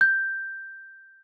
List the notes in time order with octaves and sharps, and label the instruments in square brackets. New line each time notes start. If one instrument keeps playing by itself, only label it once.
[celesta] G6